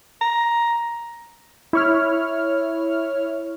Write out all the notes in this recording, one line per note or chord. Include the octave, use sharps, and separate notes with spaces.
A#5
E4 C#5 F6